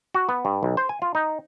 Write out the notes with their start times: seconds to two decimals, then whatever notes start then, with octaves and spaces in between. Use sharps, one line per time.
0.14 F#4
0.29 B3
0.45 G2
0.63 B1
0.77 C5
0.89 G#5
1.02 F4
1.15 D#4